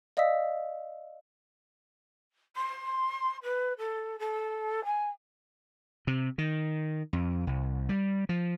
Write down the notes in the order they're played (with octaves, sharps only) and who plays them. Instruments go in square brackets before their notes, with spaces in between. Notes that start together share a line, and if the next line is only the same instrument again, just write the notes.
[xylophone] D5 D#5 F5 D#6 E6 B6
[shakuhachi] C6
B4
A4
A4
G#5
[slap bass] C3
D#3
F2
C2
G3
F3